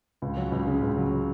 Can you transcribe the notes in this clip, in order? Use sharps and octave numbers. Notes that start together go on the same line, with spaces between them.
C#2
F#3
C#2
C#3
C#2
F#3